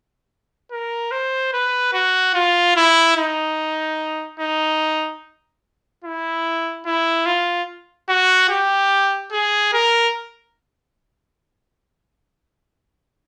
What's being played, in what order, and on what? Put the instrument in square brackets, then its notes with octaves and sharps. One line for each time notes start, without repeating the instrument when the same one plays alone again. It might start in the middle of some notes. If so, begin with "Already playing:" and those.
[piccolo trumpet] A#4
C5
B4
F#4
F4
E4
D#4
D#4
E4
E4
F4
F#4
G4
G#4
A#4